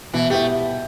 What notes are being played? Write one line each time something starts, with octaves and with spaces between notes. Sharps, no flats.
B2 E3
A3 B3 E4 G4